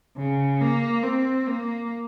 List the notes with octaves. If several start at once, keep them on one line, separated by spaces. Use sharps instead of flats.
C#3
A#3
C4
A#3